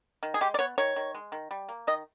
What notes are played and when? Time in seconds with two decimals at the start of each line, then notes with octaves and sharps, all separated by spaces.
0.23 D#3
0.34 G#4
0.41 G#3 G4
0.54 D5
0.59 B3 C#5
0.78 D#3 C#5
0.96 D#3
1.15 G#3
1.32 D#3
1.51 G3
1.69 A#3
1.87 D#3 D#5